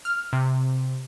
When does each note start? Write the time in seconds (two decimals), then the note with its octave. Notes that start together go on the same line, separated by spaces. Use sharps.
0.05 F6
0.33 C3